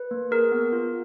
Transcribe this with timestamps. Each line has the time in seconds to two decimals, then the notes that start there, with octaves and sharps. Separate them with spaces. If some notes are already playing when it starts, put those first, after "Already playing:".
Already playing: B4
0.11 A#3
0.31 G#4 A#4
0.52 B3
0.72 F4